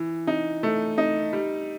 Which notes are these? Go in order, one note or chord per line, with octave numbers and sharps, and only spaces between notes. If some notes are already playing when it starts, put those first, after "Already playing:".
Already playing: E3
D#4
A3
D#4
G3